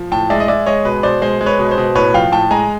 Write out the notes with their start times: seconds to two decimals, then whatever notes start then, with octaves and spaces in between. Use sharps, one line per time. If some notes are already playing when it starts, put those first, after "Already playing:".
Already playing: F3
0.12 A2 G5 A5
0.30 G#3 D5 E5
0.40 D#5
0.48 G#3 D5 E5
0.66 G#3 C#5 D#5
0.85 B2 B4
1.03 B2 C5 D5
1.22 G#3 C5
1.41 G#3
1.46 B4 C#5
1.59 B2
1.71 C5
1.78 B2
1.95 A2 B4 C#5
2.14 F3 F5 G5
2.32 A2 G5 A5
2.51 G#3 G#5 A#5